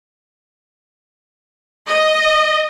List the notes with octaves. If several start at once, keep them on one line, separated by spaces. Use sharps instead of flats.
D#5